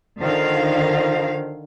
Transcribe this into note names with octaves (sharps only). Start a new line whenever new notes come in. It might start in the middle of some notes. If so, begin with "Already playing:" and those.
D3 D#3 F3 F5